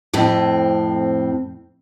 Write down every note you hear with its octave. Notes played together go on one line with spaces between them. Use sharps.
F2 A2 C4